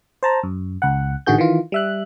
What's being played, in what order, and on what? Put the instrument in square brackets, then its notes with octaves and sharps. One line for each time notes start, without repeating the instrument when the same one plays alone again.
[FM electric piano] C5 A5 A#5
F#2
C#2 F#5
A1 D3 D#3 F#4 G#4 G6
D#3 E3 F4
G3 E5 F#6